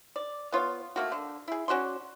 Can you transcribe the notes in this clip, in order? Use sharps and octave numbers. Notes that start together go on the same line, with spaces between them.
D5
B3 F4 C#5 F5
A3 A#3 F#4
D3
E4 G#4
C#4 F#4 D5 C6